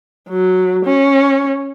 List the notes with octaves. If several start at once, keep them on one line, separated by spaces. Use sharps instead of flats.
F#3
C#4